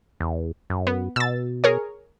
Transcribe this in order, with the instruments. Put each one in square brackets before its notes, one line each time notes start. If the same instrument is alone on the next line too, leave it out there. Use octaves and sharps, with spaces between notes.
[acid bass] E2
F#2
[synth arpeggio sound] B3
[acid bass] B2 [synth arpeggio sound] E6 A6
[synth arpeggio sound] G#4 A#4 C#5